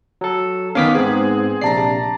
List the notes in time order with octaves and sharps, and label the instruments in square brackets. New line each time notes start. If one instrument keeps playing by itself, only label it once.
[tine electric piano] F#3 A4
[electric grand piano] D#3 B3 C#4 [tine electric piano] F5 D6 B6
[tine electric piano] G#2 B3 [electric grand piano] C4 G#4
[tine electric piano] A#1 C3 C7 [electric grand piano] D5 A5 A#5